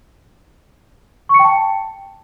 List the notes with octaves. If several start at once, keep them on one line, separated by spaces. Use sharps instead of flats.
C#6
C#7
G5
A5